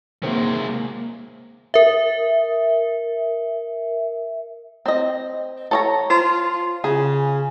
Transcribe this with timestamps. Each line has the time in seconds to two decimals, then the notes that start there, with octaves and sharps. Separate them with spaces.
0.23 C3 D#3 F#3 G#3 A#3 C4
1.74 A#4 E5
4.86 C4 D#5
5.71 A4 C#5 A#5
6.10 F4 C5
6.84 C#3 G#4